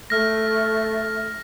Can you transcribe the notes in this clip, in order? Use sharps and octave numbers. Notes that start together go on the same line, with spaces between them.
A3 F6 A#6